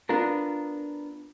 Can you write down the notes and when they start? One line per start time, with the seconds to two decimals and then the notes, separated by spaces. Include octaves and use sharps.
0.09 B3 D4 F4 A#4